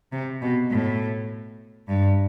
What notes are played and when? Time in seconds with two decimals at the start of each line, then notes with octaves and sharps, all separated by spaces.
0.12 C3
0.42 B2
0.71 A2
1.88 G2